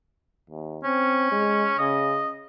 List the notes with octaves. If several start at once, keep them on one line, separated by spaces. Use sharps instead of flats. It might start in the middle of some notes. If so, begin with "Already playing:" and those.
D#2
C4 C#4
G#3
C#3 D#5